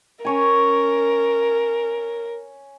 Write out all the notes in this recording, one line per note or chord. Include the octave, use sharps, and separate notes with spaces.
C#4 A#4 C#5 G#5